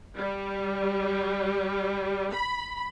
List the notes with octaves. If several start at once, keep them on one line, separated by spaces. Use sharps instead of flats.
G3
B5